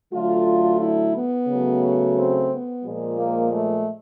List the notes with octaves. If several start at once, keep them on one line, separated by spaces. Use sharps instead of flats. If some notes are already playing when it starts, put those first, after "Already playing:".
D3 F#3 A3 F4
E4
B3
C#3 F#3 A3
C4
B3
A#2 F3 G#3
A#3
A3